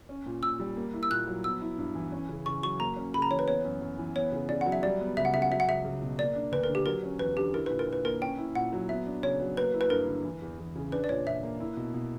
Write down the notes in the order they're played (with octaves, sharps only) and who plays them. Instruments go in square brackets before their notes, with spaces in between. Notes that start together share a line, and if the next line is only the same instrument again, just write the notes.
[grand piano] C#4
A#2
[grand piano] A#2 [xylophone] E6
[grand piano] G3
A#3
E4
[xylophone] E6
[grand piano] A#2 [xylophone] F#6
[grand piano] F#3
[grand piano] B3 [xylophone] E6
[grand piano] E4
G2
E3
C#4
C#3
[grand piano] C#3 [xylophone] C#6
[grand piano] F#3 [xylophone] C#6
[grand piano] A#3 [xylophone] A#5
[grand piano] C#4
[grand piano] C#3 [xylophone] B5
[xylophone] A#5
[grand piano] E3 [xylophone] C#5
[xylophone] B4
[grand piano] B3 [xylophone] C#5
[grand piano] F#2
F#2
E3
[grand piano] B3 [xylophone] C#5
[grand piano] C#3
[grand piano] C#3 [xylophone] D5
[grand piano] F#3 [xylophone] F#5
[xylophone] E5
[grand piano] G3 [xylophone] D5
[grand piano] B3
[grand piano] C#2 [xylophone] E5
[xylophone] F#5
[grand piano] C#3 [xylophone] E5
[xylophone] F#5
[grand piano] F#3 [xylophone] E5
[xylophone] F#5
[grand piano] C#2 [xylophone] E5
[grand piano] C#2
B2
[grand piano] A#3 [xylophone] D5
[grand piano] D4
[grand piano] D2 [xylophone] B4
[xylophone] A#4
[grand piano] D3
[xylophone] G4
[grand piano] F#3 [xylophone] A#4
[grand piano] C#4
[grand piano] E2 [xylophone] B4
[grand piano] D3 [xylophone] G4
[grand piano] E4 [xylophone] A#4
[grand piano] A#2 [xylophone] B4
[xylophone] A#4
[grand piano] A#2
[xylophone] B4
[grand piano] A#3 [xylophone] A#4
[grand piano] C#4 [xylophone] G5
[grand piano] E4
[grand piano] A#2 [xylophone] F#5
[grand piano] F#3
[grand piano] B3 [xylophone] E5
[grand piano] D4
[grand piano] C#3 [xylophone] C#5
[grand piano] F#3
[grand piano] A#3 [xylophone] B4
[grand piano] E4
[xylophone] B4
[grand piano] G2 [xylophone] A#4
[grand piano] D3
E3
E2
E2
C#3
[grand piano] D4 [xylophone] B4
[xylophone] D5
[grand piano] A#2 [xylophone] C#5
[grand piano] A#2 [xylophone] E5
[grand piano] A#3
E4
B2
B2